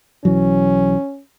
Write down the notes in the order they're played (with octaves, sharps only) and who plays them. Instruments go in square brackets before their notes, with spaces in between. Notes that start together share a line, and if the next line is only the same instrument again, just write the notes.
[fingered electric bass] B1 E3 F#3 [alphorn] C#4